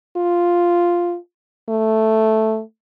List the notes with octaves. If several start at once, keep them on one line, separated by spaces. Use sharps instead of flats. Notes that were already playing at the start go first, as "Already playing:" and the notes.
F4
A3